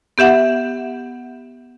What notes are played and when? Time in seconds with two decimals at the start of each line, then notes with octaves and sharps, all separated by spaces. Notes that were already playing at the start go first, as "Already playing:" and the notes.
0.18 B3 G4 E5 F#5